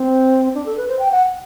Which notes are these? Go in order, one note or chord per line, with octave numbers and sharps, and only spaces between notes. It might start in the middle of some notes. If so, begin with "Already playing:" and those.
Already playing: C4
D4
A4
B4
C5
G5
F#5